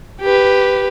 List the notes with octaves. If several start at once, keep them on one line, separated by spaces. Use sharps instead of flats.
G4 B4